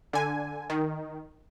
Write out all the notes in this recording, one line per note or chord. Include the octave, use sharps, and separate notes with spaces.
D3 G#5
D#3